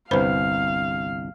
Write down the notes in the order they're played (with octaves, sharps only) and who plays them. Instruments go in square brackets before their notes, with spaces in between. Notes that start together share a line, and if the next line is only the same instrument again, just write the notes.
[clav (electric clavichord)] G1 C2 [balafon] B4 C5 B5 [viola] F5